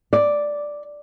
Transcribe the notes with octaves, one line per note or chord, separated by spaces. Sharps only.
D5